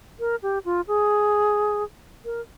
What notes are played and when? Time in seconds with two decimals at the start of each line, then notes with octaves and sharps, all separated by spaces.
0.20 A#4
0.43 G4
0.65 F4
0.88 G#4
2.25 A#4